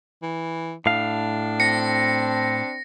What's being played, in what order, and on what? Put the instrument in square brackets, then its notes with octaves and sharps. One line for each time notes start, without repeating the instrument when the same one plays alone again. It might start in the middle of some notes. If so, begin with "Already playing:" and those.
[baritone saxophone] E3
[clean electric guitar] A2 F5 [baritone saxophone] D4
[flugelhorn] C4 [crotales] A#6 C#7